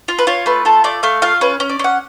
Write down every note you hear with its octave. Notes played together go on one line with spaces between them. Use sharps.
F4
B4
F4 C#5
A3 B4
F4 A4
A3 D5
A3 F5
F4 F5
C#4 B4
C#4
D5
C#4 F#5